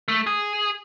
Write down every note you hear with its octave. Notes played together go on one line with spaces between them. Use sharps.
A3
G#4